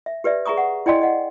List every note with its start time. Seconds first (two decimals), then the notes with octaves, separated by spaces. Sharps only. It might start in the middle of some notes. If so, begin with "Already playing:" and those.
0.06 E5
0.24 G4 B4 D5 E5
0.46 G#4 E5 A#5 C#6 D#6
0.57 F#5
0.86 E4 D5 D#5 G5 G#5 C6
1.02 D#5 F#5